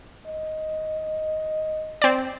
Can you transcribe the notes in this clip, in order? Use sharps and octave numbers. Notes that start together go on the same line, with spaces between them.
D#5
C4 D5